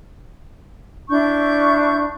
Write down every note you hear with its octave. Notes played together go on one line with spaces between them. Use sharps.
D4 E4 C#6 G6